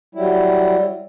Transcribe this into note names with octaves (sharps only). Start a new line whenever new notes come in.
F#3 G3 E4